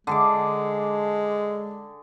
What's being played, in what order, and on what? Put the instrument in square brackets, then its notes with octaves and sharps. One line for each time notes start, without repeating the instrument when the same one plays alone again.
[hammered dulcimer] D3 G#4 D6 [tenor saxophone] G#3